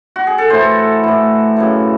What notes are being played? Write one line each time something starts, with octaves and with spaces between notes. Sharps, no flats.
F#4
G#4
A4
A2 E3 C5
A2 E3
F#2 C#3 E3